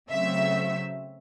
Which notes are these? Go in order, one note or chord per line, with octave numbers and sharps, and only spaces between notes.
C#3 F#3 A3 C4 E5